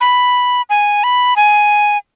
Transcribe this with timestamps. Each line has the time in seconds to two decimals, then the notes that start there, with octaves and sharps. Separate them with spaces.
0.01 B5
0.70 G#5
1.04 B5
1.36 G#5